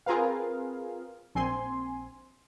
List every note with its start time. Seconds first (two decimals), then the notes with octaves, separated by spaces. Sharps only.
0.06 C4 F4 G#4 A#4 B4 F5
1.35 A#1 C4 G#5 C6